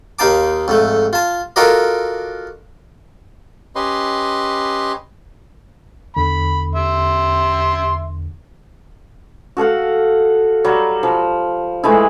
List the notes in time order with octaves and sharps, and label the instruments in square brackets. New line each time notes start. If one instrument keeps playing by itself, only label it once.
[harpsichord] D#2 D#4 F5 A5 D6
F2 G#2 A3
F4 A5
F4 F#4 A4 A#4 D5 D#5
[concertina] C#4 G4 B4 D#5 C6
[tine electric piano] E2 D3 [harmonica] B5
[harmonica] E5 C6
[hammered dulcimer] F#4 A4 F5 F#5
F#3 G3
F3
E3 G#3 A3 E4